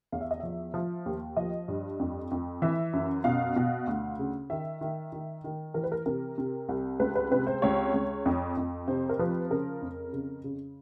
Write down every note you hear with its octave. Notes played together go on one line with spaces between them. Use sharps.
E2 F5
E5
D#5
F3 E5
F3
D#2
F3 D#5
G2
F2
F2
E3 E5
F#2
B2 F5
B2
D2
C#3
D#3 E5
D#3
D#3
D#3
E3 A#4
B4
A#4
C3 A#4
C3
C2
C#2 B4
B4
C3 B4
C5
C#2 C#5
C#2
F2
F2
C3 C5
A#4
F3 B4
C#3 A#4
F2
C#3
C#3